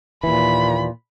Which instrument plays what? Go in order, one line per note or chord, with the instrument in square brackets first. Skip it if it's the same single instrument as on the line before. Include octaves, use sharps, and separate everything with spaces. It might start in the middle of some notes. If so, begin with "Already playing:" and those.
[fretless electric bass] D#2 E3 [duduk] A#2 [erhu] B5